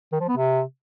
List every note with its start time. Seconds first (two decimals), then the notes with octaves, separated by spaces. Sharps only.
0.12 D#3
0.20 F3
0.28 B3
0.37 C3